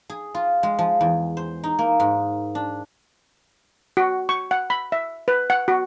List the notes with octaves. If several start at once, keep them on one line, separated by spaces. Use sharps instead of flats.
G#4
F4
G#3
F3
E2
C5
D#4
A#3
G#2
D4
F#4
C#6
F#5
B5
E5
B4
F#5
F#4